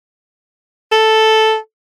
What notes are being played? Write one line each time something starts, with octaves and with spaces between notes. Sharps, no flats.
A4